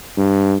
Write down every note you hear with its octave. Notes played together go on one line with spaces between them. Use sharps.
G2